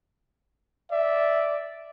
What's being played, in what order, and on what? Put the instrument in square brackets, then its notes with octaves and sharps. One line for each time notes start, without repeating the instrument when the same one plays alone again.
[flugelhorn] D5 [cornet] E5